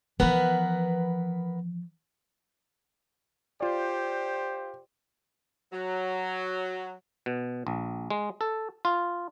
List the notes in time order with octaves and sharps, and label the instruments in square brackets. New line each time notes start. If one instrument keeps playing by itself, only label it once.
[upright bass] E3 F3 [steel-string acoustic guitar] B3 A#4 B4
[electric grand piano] F4 D5 [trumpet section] G4 C5
[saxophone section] F#3
[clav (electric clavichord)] B2
A#1
G#3
A4
F4